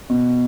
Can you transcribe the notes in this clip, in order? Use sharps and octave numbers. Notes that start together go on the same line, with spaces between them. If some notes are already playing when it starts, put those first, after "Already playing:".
B2